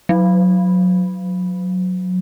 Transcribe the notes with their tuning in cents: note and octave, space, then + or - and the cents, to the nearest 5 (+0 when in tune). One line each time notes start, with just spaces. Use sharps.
F#3 -15